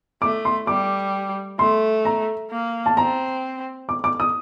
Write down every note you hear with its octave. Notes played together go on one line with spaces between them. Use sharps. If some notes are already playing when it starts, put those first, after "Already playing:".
A3 D6
C6
G3 D6
A3 C6
A#5
A#3
A5
C4 A#5
D6
D6
D#6